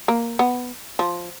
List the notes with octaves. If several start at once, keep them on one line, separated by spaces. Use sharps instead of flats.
A#3
B3
F3